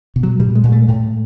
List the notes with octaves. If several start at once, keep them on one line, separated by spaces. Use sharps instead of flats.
B2
F#3
A#2 G3
G#3
A#2
A3
A2